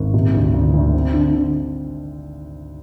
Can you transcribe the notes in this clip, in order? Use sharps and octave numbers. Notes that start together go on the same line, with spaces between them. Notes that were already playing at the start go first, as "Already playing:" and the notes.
Already playing: G#1
C3
D2
D2
D2
C4
D3
D3